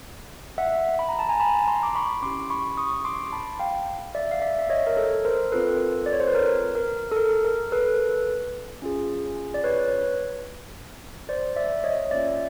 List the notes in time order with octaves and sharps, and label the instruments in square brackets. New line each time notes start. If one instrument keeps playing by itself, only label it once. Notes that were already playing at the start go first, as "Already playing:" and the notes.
[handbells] E5 F#5
B5
A#5
A5
G#5 A#5
A5 B5
A#5 C6
D6
B5 C#6
C#4 E4 G4 C6 D6
B5 C#6
C#6 D#6
C6 D6
A5 B5
F5 G5
D5 E5
F5
D5 E5
E5
C#5 D#5
A#4
A4
A#4 C5
C4 F4 A4 B4
D5
C#5
C5
B4
A#4
A#4
A4
A#4
A#4
A4 B4
C#4 F4 G#4
D5
B4 C#5
C5 D5
D5 E5
C#5 D#5
A#3 C#4 F4 D5 E5